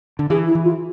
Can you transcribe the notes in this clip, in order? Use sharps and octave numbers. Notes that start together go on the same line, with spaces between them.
D3
E3 G#4
E4
E3
F4